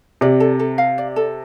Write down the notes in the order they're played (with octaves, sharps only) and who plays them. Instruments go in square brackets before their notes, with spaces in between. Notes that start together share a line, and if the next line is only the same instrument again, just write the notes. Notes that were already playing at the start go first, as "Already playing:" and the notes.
[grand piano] C3 [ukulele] D5
[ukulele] A4
A4
F5
D5
A4